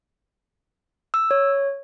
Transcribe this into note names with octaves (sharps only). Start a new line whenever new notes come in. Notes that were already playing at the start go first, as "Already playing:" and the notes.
E6
C#5